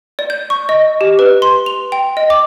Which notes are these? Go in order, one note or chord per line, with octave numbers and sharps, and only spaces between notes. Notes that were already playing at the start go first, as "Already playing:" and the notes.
D5
G6
C#6
D#5
G4
B4
C6
F7
G5
D#5
D6